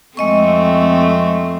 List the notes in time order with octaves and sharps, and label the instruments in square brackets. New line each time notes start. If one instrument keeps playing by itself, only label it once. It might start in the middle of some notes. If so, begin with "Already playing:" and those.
[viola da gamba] F2 A3 C4 [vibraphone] G#3 D#5 C#6